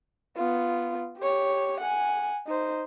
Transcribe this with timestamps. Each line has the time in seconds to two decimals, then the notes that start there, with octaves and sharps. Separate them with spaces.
0.37 B3 F4
1.19 G4 C#5
1.81 F#5 G#5
2.47 D#4 C5